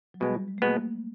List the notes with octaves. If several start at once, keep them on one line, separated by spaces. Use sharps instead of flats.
F#3
B2 G3 G#3 B3
G3
G#3
A3
B2 G#3 A#3 B3